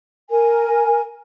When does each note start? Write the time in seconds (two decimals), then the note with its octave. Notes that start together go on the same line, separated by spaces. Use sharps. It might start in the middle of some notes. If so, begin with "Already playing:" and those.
0.30 A#4 G#5